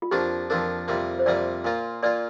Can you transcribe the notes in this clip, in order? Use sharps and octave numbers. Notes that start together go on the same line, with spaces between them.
F4
F2 F3 A#3 D4 G4
F2 F3 A#3 D4 A#4
F2 C3 G3 A#3
C5
F2 C3 G3 A#3 D5
A#2 A#3 F4
A#2 A#3 F4 D5